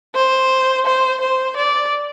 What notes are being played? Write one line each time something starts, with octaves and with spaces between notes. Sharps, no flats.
C5
C5
C5
D5